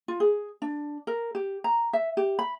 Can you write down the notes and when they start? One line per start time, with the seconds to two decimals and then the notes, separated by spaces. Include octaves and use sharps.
0.08 F4
0.20 G#4
0.62 D4
1.07 A#4
1.35 G4
1.64 A#5
1.93 E5
2.17 G4
2.39 B5